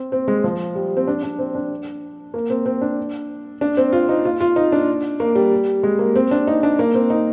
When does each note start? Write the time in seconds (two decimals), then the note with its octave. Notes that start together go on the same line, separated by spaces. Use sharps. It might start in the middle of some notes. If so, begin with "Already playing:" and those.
Already playing: C4
0.12 C4
0.28 G#3
0.44 F3
0.75 G3
0.97 C4
1.07 D4
1.23 D4
1.39 C4
1.55 D4
2.34 A#3
2.50 C4
2.66 C4
2.81 D4
3.61 D4
3.77 C4
3.93 F4
4.09 D#4
4.25 F4
4.40 F4
4.56 D#4
4.72 D4
5.20 A#3
5.35 G3
5.83 G#3
5.99 A#3
6.16 C4
6.31 D4
6.47 D#4
6.63 D4
6.79 A#3
6.95 C4
7.10 D#4